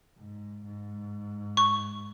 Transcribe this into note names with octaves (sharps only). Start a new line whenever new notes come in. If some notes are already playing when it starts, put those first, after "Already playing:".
G#2
G#2
C#6